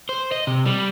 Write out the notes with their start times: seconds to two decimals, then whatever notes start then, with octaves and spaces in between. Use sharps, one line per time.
0.09 C5
0.32 D#5
0.47 C3
0.66 G3